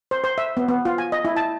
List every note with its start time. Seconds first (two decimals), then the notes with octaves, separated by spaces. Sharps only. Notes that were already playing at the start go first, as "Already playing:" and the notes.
0.11 C5
0.24 C5
0.38 E5
0.57 B3
0.68 B3
0.85 F4
0.98 G#5
1.12 D#5
1.25 E4
1.36 A5